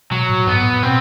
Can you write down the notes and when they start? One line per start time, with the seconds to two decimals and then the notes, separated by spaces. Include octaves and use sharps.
0.11 B2 F#3
0.29 A2
0.47 G2 B3
0.60 G2
0.65 A2
0.83 B2 C4